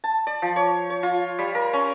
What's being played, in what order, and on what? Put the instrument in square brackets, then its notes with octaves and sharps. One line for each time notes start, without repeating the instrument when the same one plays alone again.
[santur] A5
D5
F3
C#5
C#5
F4
G3
A#4
C#4